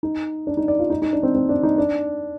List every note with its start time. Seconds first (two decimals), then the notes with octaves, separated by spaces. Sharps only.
0.03 D#4
0.47 D4
0.57 D#4
0.68 D5
0.79 F4
0.90 D#4
1.02 D#4
1.13 D4
1.23 C4
1.35 C4
1.49 D4
1.63 D#4
1.78 D4